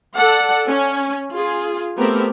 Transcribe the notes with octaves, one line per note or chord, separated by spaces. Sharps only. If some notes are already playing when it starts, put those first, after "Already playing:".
A4 D5 F#5
C#4
F4 G#4
A3 B3 C4 G4 A#4